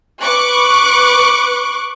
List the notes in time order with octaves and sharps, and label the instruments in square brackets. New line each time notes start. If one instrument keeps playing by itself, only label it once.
[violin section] B4 C#6 D6 F#6